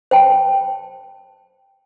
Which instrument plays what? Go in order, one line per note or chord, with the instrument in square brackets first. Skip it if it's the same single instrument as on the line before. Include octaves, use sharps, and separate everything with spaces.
[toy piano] C5 G5 A5